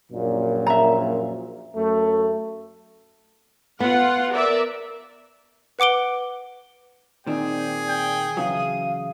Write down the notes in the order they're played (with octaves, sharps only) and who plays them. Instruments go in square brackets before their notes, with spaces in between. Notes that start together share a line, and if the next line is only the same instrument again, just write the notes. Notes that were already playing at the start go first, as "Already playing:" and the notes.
[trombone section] A#1 F#2 A#2
[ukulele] E5 A#5
[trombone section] F#2 A3
[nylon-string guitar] B3 [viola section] F4 F#5
[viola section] A#4 D5 E5
[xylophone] B4 F#5 D6 D7 G7
[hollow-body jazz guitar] A#2 D#3 C4 [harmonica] G#4 [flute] D5 [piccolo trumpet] G5
[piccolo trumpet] G5
[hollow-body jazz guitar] C#3 E3 F#3 [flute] F5 [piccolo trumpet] D#6